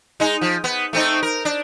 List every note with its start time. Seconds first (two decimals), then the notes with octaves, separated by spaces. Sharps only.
0.20 G#3 D#4
0.41 F3
0.64 B3
0.93 A3 C4 D#4
1.22 A#4
1.45 D4